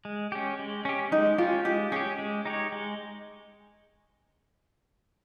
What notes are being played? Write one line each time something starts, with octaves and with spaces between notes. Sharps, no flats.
G#3
C#4 G4
G#3
C#4 G4
G#3 D#4
C#4 F4 G4
G#3 G4
C#4 G4 G#4
G#3
D#4 G4 C#5
G#3